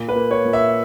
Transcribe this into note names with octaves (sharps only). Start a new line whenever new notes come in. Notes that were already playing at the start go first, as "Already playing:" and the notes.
Already playing: A#2
B4
A#3
C#5
A#2
E5